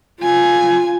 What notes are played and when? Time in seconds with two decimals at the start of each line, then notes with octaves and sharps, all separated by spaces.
0.20 F4 G#5